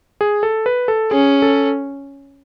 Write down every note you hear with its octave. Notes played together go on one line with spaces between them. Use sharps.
G#4
A4
B4
A4
C#4 G#4
A4